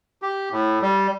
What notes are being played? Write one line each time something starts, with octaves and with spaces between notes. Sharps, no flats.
G4
A2
G3